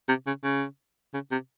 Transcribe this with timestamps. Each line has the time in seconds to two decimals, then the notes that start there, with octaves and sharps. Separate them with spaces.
0.09 C3
0.27 C#3
0.44 C#3
1.14 C#3
1.32 C3